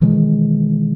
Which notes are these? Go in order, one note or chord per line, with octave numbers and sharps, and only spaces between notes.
B2 D#3 E3 G#3